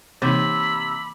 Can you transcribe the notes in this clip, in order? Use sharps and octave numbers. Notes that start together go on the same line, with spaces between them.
C3 E3 A#3 D#4 B5 E6